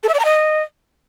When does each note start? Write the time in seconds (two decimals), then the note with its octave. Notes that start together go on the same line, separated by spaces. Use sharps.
0.03 A4
0.09 E5
0.14 D5
0.19 A#5
0.25 D#5